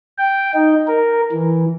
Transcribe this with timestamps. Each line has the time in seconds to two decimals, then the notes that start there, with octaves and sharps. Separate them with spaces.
0.18 G5
0.54 D#4
0.88 A#4
1.32 E3